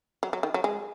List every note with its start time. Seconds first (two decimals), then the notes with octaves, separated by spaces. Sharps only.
0.23 F#3
0.33 F#3
0.43 D#3
0.54 F#3
0.64 G#3